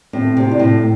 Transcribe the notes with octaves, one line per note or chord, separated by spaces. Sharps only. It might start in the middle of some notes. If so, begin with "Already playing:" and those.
A2 C4
C3
G2 E4
A2